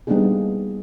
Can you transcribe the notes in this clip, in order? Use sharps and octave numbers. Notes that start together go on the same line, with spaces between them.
G3 A#3 B3 D4 D#4 G#4